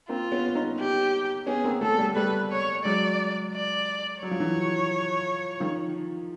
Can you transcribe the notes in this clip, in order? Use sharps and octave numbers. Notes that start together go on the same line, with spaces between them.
A#3 C4 F4
B3 C#4
C#4 D#4
G4
B3 C#4 G#4
A#3 C4
A3 B3 A4
G3 A3
G3 A3 B4
C#5
F#3 G#3 D5
D5
F#3 C#5
F3
E3 F#3
D#3 F3